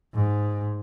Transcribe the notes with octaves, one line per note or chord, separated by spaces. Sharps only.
G#2